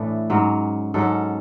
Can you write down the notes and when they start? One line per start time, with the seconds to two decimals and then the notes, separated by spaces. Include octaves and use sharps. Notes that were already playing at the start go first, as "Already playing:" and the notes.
Already playing: A2 E3 A3 D4
0.30 G#2 F#3 C#4
0.94 G#2 F#3 C#4 A4